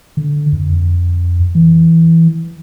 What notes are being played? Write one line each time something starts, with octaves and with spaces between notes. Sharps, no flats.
D3
F2
E3